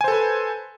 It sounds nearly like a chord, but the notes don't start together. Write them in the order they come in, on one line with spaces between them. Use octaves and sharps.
G#5 C5 A4 B4